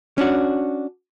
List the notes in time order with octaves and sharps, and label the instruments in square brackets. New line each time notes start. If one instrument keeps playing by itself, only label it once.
[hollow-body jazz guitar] C#4 D4 F#4